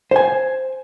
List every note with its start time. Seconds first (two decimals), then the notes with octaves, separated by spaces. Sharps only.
0.11 C5 G#5